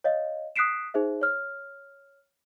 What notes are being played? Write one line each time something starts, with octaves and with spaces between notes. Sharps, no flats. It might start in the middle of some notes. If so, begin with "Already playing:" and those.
C#5 D#5 F5
D#6 F#6 B6 C7 D7 E7
D#4 G#4 C5 E5
C#5 F6